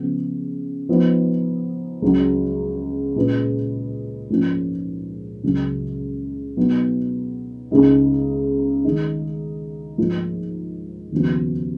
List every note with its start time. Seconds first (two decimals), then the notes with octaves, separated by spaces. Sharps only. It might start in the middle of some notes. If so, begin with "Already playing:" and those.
Already playing: C#3 F3 B3
0.89 F3 B3 D#4
2.02 C#2 C#3 F#3
3.16 A#2 G#3 C#4 F4 B4
4.30 G#2 F3 A#3 C#4 F4
5.44 C#2 C#3 F#3
6.57 B2 F#3 B3 D#4
7.71 C#2 C#3 G#3 D#4
8.84 D#3 G#3 D#4
9.98 G#2 F3 A#3 F4
11.12 D#2 C#3 F3 B3 F#4